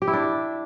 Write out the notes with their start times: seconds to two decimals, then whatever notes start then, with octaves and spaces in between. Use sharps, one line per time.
0.02 G4
0.08 E4
0.13 D4